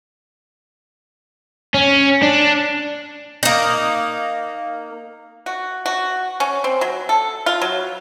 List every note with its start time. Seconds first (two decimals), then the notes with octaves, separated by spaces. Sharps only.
1.74 C#4
2.22 D4
3.43 A#3 D#4
5.46 F#4
5.86 F#4
6.40 C#4
6.64 C4
6.81 F#3
7.09 A4
7.46 F4
7.62 F#3